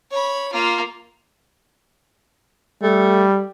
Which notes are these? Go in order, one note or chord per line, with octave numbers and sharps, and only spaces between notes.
C#5 B5
A#3 F4
G3 A3